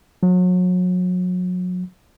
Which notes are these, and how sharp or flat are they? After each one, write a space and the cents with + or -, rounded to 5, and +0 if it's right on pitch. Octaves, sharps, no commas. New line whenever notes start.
F#3 -35